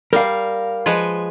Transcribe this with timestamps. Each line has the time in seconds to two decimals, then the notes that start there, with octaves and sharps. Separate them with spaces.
0.13 G3 A#4 F5
0.86 F3 G#3 B4